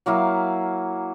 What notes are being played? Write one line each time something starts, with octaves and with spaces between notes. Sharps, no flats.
F#3 A#3 E4 F5